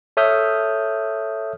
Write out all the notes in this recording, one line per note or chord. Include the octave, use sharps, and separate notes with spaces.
A4 C#5 E5 D#6 F6 G6